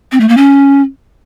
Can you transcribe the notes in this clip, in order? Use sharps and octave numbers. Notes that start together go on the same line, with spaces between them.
C4
A3
A#3
C#4